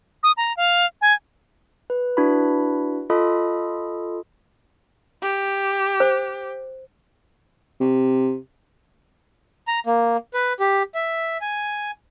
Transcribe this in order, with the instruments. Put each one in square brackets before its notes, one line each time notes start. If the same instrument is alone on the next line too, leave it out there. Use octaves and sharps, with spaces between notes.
[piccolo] D#6
A#5
F5
G#5
[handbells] B4
D4 E4 F#4 B4 B5
F4 A4 D#5 B5 D#6
[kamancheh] G4
[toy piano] C5
[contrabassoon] C3
[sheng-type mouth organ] A#5
A#3
B4
G4
E5
G#5